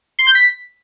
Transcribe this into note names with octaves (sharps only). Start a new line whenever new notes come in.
C6
G6
B6